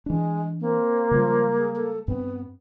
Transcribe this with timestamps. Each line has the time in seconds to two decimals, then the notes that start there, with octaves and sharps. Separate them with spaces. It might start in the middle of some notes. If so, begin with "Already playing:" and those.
0.06 E3 G#3 D4
0.61 A#3 C4
1.11 C#3 F3 G3 G#3
1.58 G#4
1.76 A4
2.08 G2 B3 C4